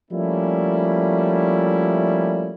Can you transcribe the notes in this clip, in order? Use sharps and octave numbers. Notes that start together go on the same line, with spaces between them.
F3 G3 A3 A#3 C#4 E4